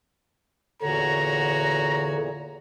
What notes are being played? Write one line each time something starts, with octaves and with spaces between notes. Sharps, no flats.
E2 A#2 D3 F#4 C#5 A#5